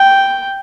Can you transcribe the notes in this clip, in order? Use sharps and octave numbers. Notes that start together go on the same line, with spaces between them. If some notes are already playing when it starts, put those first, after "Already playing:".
Already playing: G5